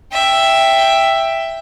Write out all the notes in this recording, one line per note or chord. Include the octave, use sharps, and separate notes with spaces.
E5 G5